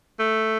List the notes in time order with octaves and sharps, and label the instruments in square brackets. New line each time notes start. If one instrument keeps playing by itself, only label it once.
[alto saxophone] A3